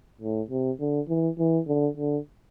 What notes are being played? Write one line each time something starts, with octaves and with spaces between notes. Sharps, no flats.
A2
C3
D3
E3
E3
D3
D3